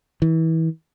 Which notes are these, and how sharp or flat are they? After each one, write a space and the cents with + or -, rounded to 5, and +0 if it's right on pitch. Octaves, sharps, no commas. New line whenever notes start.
E3 -30